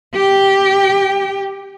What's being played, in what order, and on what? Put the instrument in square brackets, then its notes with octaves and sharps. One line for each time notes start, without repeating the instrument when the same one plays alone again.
[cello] G4 G5